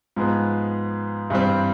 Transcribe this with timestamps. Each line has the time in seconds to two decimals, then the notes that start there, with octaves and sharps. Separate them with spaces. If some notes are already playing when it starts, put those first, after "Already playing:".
0.16 G#2 F3 G#3 B3
1.30 G2 E3 G3 C4